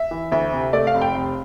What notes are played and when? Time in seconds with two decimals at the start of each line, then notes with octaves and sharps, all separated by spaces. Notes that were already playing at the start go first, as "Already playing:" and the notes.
Already playing: E5
0.11 E3
0.32 D2 E5
0.52 C3
0.73 A3 D5
0.87 F5
0.94 F1
1.01 G5
1.15 F1